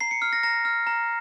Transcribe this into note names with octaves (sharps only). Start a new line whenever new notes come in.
A#5 C7
C#7
F6 C7
A#6
A#5 A#6
F6
A#5